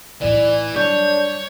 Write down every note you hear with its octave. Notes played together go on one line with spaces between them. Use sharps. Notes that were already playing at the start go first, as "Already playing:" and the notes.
B1 A2 E3 D5
G2 F#3 D4 C#5 G6